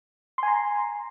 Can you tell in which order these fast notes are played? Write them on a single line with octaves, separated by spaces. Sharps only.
C6 G#5 A#5